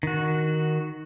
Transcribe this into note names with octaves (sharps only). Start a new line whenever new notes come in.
D#3 F#4